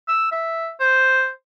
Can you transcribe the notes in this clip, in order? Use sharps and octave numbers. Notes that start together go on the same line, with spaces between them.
E6
E5
C5